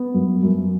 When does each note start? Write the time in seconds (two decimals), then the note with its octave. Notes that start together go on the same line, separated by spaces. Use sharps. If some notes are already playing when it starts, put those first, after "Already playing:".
Already playing: B3
0.14 F#2
0.43 F#2